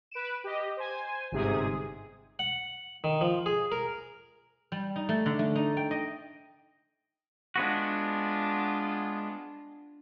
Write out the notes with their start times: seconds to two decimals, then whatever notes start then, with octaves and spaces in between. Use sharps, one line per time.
0.11 B4 D7 E7
0.44 G4 D#5
0.77 C5 G#5
1.32 G1 G#2 C3 G#4 D#6
2.39 F#5
3.04 D#3
3.21 F3
3.46 G#4
3.72 A#4
4.72 G3
4.96 D#4
5.09 A3
5.26 D3
5.39 A3
5.56 D#4
5.77 G5
5.91 D#5
7.56 G#3 B3 D4 F4 F#4